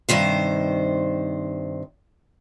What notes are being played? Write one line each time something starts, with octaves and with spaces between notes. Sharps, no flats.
G2 C3 D#3 C5